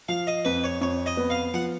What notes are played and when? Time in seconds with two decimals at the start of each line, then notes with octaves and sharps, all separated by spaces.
0.09 F3 F5
0.27 D#5
0.45 F2 B4
0.64 C#5
0.81 F2 C#5
1.06 D#5
1.17 B3
1.30 F5
1.54 F3 F#5